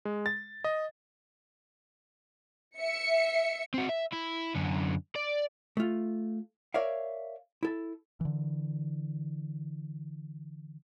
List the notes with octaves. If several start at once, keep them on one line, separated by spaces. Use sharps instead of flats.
G#3
A6
D#5
E5 C#7
C4 F#4
E5
E4
F#2 D3
D5
A3 F4
A#4 C#5 D5 E5 F5
E4 A4
D3 E3